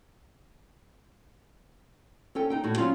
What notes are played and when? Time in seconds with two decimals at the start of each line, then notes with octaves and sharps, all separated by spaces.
2.35 C#4 A4 G5
2.50 D#4 G5
2.64 A2 F#4
2.77 F#3 C#4 F4